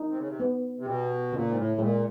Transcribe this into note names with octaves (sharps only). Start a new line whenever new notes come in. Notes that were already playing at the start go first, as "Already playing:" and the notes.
Already playing: D#4
C3
C#3
C3
B3
C3
B2 G4
A#2 C#3
G#2
A2
A#2 G#3